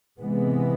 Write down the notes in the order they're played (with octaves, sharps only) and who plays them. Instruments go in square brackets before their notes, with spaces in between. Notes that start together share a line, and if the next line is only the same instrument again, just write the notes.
[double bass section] C3 E3 G#3 B3